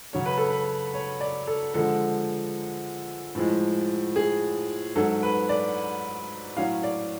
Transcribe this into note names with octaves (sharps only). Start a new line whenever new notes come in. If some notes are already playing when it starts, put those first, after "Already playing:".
C#3 F#3 C#4 C#5
B4
A4
B4
C#5
D5
A4
D3 F3 G#3 A4
A2 F3 G#3
G#4
G#2 F#3 C#4 A4
B4
D5
A2 F#3 C#4 F5
D5